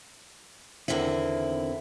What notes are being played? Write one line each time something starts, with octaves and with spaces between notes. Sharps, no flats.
E2 G#2 D3 D#3 C4 E4